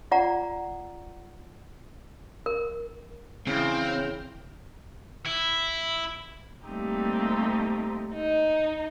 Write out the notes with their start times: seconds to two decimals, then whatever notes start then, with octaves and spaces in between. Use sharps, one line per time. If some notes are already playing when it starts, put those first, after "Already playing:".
0.11 F4 D5 F#5 A#5
2.46 A#4
3.47 C#3 E3 C4 G5 F6
5.26 E4
6.66 G3 A3 A#3 C4 D#4 G4
8.14 D#4